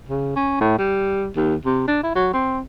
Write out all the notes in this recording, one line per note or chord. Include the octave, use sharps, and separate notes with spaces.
C#3
C#4
A2
G3
D#2
C3
D4
E4
F#3
C4